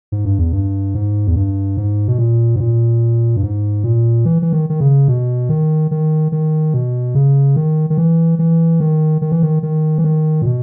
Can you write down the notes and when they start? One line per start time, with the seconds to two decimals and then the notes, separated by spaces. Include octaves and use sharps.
0.12 G#2
0.25 G2
0.39 E2
0.52 G2
0.95 G#2
1.27 E2
1.36 G2
1.77 G#2
2.08 B2
2.19 A#2
2.56 G#2
2.60 A#2
3.36 G2
3.43 G#2
3.84 A#2
4.25 E3
4.42 E3
4.53 D#3
4.70 D#3
4.80 C#3
5.08 B2
5.49 D#3
5.91 D#3
6.32 D#3
6.74 B2
7.15 C#3
7.56 D#3
7.90 D#3
7.98 E3
8.39 E3
8.80 D#3
9.22 D#3
9.32 E3
9.43 D#3
9.63 D#3
9.98 E3
10.04 D#3
10.42 A#2
10.46 B2